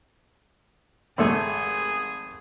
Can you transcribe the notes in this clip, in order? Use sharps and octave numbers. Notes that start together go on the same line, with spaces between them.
G#1 A3 G#4